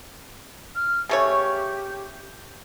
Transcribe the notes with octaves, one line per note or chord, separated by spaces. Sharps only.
F6
C#3 A3 G4 C#5